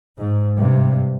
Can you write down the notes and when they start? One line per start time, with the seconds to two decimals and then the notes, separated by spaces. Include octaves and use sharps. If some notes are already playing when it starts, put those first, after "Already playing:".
0.19 G#2
0.58 G2 C3